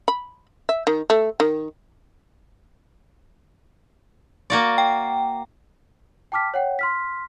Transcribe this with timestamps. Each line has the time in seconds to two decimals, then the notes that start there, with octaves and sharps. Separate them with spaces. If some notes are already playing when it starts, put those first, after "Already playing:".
0.08 B5
0.69 E5
0.87 D#3
1.10 A3
1.40 D#3
4.50 A#3 F#4 D5
4.78 G5
6.32 G5 A5 D6 F6 B6
6.54 C#5 F#5 G5
6.79 C6 F6 B6